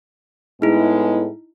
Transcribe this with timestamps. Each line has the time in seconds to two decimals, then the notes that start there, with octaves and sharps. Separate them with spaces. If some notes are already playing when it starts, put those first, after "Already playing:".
0.62 A2 G#3 B3 D#4 E4